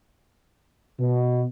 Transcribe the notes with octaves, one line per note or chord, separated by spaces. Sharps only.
B2